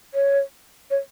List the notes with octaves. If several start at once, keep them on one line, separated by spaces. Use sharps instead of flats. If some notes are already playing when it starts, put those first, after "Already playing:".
C#5
C#5